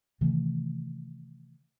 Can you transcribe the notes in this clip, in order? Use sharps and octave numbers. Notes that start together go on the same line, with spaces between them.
C3 D#3 E3 A3